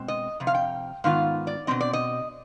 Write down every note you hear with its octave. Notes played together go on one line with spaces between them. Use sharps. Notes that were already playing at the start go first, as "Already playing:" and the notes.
Already playing: B2 G#3 C4
D#5
F2 C3
F5
G5
G#2 D#3 B3 F4 F5
D5
B2 G3 C4 D#5
D5
D#5